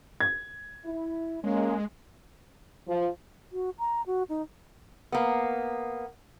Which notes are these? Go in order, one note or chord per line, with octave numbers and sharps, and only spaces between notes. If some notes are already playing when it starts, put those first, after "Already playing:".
G#6
E4
G#3 A#3 C#4
F3
F#4
A#5
F#4
D#4
A#3 B3